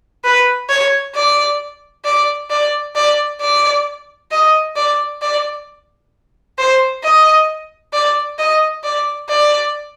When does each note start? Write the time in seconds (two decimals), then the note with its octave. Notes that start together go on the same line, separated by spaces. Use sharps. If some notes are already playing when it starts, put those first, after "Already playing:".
0.24 B4
0.69 C#5
1.15 D5
2.05 D5
2.50 D5
2.95 D5
3.41 D5
4.31 D#5
4.76 D5
5.22 D5
6.58 C5
7.03 D#5
7.93 D5
8.39 D#5
8.84 D5
9.29 D5